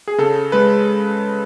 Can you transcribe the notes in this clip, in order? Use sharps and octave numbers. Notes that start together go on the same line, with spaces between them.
G#4
C#3 A4
G#3 B4